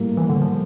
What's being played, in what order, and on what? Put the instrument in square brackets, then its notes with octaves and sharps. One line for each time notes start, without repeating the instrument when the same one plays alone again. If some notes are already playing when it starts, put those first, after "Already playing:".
Already playing: [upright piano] A2 G3 A#3
[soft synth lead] E3
D3
F3